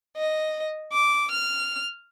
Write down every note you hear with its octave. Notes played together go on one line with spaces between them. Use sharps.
D#5
D6
F6